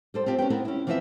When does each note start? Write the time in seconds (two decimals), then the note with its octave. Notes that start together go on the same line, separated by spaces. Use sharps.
0.14 G3 A4 C5
0.26 C4 F4 G4
0.38 C#4 F#4 B4 G5
0.50 B3 C4 E4 A#4
0.65 C#4 E4
0.87 E3 F3 B3 C4 D#5 E5